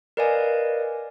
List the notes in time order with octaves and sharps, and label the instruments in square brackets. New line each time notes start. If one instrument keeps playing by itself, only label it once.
[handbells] A#4 B4 D5 D#5 F5 G#5